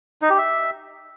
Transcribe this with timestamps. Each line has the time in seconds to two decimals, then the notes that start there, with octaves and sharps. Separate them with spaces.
0.22 D#4
0.30 G4
0.38 E5